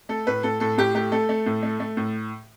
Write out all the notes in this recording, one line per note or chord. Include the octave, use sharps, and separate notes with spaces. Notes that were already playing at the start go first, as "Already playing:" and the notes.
A3 A4
A2 B4
A2 A4
A2 A4
A2 G4
A3 G4
A3 A4
A3
A2
A3
A3
A2